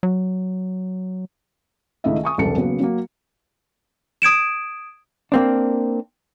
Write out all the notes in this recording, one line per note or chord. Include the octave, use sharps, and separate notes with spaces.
F#3
C#2 D#3 A3 E4 D#5 E5
G#5 C#6 D#6
E1 C2 F#2 A4 A5 C#7
C#3 F#3 A#3 B3
F#3 A#3
D#6 G#6 D7 E7
A#3 C4 D4